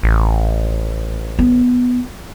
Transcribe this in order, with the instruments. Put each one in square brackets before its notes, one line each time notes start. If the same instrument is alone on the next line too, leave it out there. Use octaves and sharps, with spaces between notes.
[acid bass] A1
[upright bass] B3